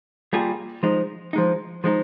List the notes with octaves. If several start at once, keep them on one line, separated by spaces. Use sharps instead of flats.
G3 A#3 F4 G#4
F3 G#3 D#4
F3 G#3 D#4
F3 G#3 D#4